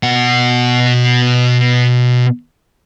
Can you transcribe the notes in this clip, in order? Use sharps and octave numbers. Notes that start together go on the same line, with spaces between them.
B2 F#5